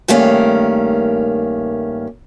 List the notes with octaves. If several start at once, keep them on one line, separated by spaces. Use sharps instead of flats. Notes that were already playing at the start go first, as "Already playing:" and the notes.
G2 D#3 A3 A#3 C#4